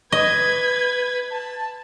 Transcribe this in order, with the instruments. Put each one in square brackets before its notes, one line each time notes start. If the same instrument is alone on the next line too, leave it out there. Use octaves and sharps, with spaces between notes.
[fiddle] B4 [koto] D#5 [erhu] G#6
[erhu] A5